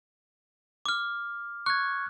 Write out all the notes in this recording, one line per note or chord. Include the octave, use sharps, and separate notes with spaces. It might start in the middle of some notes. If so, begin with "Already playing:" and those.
D6 F6
C#6 F#6 G#6